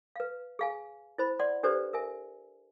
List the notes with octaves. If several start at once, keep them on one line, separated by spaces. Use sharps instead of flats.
B4 F5
G#4 F5 G#5
E4 C5 B5
D5 F#5 C6
D4 G4 A4 B4 C5 D5
A#4 E5 G#5